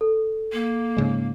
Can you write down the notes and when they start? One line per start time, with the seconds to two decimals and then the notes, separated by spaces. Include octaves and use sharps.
0.01 A4
0.53 A#3
0.97 G#2 C#3 G#3